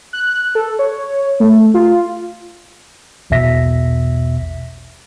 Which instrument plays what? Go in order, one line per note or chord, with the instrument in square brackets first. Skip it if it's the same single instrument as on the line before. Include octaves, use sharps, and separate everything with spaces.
[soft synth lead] F#6
A4
C#5
A3
F4
[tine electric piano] A#1 E2 B2 E5 A#6 B6